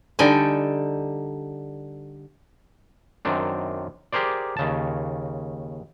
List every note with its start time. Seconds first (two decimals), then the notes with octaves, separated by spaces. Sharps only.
0.19 D3 G3 D#4 A4 G5 G#5
3.25 F#2 D#3 C4 D4
4.13 G4 G#4 A#4 C5 D5
4.57 D#2 C#3 A5